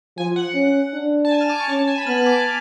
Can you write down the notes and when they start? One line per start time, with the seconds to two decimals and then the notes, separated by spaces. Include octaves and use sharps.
0.17 F3 G#5
0.36 F#5
0.55 C#4
0.93 D4
1.25 A5
1.31 G#5
1.41 F6
1.49 D6
1.60 C#6
1.68 C#4 A5
1.79 A5
1.87 G#5
1.98 B5
2.07 B3 F6
2.18 F6
2.26 D6